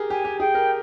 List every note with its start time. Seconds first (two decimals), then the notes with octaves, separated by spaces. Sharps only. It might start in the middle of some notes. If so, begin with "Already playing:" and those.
Already playing: G4 G#4 A#4
0.10 G4 G#5
0.25 G4
0.40 G#4 G5
0.55 A#4